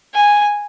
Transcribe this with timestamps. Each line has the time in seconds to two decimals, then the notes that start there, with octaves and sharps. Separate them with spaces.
0.14 G#5